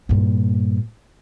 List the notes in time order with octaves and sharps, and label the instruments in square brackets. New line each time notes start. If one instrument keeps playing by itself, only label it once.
[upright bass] G2 A#2